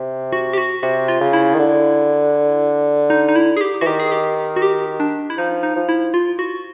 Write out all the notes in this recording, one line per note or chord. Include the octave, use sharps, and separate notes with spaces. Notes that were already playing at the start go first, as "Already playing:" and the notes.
Already playing: C3
F#4
G4
F#4
C3 F#4
F4
C#3
E4
D#3
D3
D#4
D#4
E4
G#4
G4
E3 F#4
D#3 G4
G#4
G4
F#4
G4
D4
E4
F3 D#4
D#4
F3
E4
F4
F#4